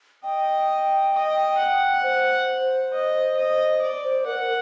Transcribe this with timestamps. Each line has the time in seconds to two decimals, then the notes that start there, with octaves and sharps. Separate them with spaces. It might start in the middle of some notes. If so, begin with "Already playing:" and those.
0.23 D#5 G5
1.13 D#5
1.57 F#5
2.03 C5
2.92 D#5
3.37 D#5
3.82 D5
4.04 C5
4.26 A#4 F#5